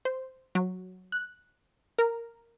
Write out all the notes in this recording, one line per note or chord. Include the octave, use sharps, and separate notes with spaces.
C5
F#3
F#6
A#4